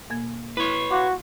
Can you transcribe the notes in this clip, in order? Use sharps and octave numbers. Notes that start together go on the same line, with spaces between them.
B2 A#3 G#6
E4 B4 C#5
F#4 F5 C6 D6